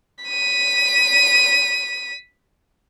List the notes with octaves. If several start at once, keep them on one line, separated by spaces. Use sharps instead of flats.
B6 D#7